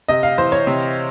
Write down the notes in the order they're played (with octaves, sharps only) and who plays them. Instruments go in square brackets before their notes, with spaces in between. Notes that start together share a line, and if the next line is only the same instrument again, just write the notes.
[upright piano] C3 D#5
F5
E3 C5
C#5
C3